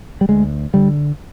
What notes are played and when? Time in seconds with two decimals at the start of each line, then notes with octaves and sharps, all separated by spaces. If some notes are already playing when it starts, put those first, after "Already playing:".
0.21 G3
0.29 D2 G#3
0.74 D3 G3